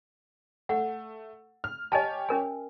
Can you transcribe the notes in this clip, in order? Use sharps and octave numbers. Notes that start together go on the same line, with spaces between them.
A3 F#5
F6
G4 C#5 D#5 G#5 A5
C#4 A#4 G#5